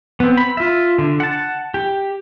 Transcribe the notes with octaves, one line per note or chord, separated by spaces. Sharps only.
B3 C4
B5
F4 E5
D3
F#5 A5
G4